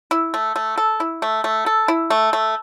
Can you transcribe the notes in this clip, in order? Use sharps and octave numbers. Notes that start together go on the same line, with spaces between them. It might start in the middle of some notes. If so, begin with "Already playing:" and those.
E4
A3
A3
A4
E4
A3
A3
A4
E4
A3
A3